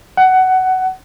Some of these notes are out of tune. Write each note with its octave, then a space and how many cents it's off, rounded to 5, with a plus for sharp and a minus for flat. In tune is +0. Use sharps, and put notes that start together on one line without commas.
F#5 +15